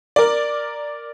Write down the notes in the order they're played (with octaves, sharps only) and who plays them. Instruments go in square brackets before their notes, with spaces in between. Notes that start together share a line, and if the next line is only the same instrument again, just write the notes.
[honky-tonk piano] A#4 D5